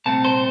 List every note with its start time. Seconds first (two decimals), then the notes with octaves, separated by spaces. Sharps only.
0.05 C2 A#2 A3 C4 A5
0.25 C5